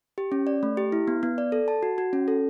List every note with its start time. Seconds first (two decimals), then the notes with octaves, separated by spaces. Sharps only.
0.18 G4
0.32 C#4
0.47 D5
0.63 A3
0.77 G4
0.92 E4
1.08 B3
1.23 B3
1.38 D5
1.52 A4
1.68 A5
1.83 F#4
1.98 F#4
2.13 C#4
2.28 A4